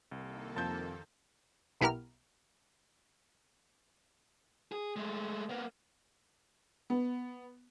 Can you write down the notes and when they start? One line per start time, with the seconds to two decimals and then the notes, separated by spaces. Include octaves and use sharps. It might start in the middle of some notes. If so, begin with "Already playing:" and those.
0.11 C2 D#3 A#3 A4
0.56 F2 A5 G6
1.81 B1 B3 E4 G4 A#4 F6
4.72 G#4
4.96 G#3 A3
5.49 A#3 B3
6.90 B3